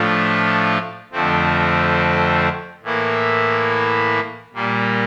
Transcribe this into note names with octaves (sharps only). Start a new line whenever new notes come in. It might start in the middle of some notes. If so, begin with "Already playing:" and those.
Already playing: A2 F3 A3 D4 F4
F2 D3 F3 A3 C4
A2 E3 A#3 E4
A#2 G3 A#3